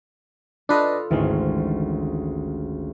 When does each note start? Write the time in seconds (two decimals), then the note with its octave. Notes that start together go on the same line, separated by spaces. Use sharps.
0.69 D4 F4 A4 B4 D#5
1.11 G#1 D2 E3 G#3 C#4